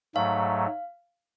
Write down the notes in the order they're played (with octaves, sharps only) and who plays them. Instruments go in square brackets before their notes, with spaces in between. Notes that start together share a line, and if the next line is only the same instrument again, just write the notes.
[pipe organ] G#2 F#3 A3 [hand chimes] F5